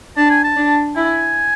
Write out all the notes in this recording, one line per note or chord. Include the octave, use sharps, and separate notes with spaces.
D4 A5
G#5
A5
D4
E4 G#5